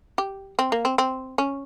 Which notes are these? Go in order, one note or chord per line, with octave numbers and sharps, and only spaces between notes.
G4
C4
A#3
C4
C4
C#4